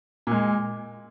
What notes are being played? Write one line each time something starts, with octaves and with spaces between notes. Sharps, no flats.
A#2 G#3